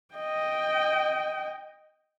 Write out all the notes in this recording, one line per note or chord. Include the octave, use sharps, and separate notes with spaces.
D#5 G5